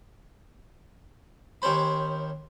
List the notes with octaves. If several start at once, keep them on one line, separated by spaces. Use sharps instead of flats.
D#2 C4 C#4 C5 B5